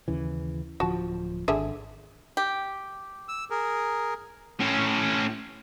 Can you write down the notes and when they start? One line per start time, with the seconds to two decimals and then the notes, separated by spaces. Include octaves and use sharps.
0.08 D#2 C#3 E3
0.80 D1 F3 F#4 A5
1.48 G#1 D3 G#4 E5
2.37 G4
3.29 E6
3.50 G#4 A#4
4.60 A2 C#4